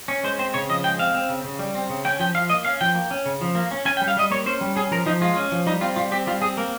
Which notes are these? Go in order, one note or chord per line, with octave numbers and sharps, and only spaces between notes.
C#4
G#3 C5
C4 C5
C#3 C#5
F3 D#5
G#3 G5
C4 F5
C4
C#3
C#3
G3
C4
C#3
C#4 G5
F3 G5
F3 F5
A#3 D#5
C#4 F5
F3 G5
A#3
C#4
C#3
F3
A#3
C#4
C#4 G#5
G5
G3
F5
G3 D#5
A#3 C#5
C#4 C5
G3
C#4 G#4
F3 A#4
F3 D#4
G#3 F4
C#4
F3
G3 D#4
C4 F4
G3 F4
C4 G4
G3 F4
C4 G#4
A#3 A#4